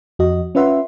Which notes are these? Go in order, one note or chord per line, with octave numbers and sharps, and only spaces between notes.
F2 F#4 D#5
C#4 F4 B4 E5 F#5 C6